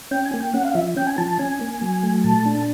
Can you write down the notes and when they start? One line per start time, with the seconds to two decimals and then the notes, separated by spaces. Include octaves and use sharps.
0.11 C#4 G5
0.26 G#5
0.33 A#3
0.40 G5
0.54 C#4 F#5
0.65 F5
0.75 F3 E5
0.96 C#4 G5
1.07 G#5
1.18 F3 A5
1.28 A5
1.39 C#4 G#5
1.61 A#3
1.82 F#3
2.03 A3
2.24 A#2 A5
2.46 D4